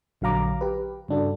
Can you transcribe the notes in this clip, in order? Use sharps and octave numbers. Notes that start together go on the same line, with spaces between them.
A#1 D3 F#3 F5 A#5 D6
G4 B4
G2 C#3 D4 F#4 A4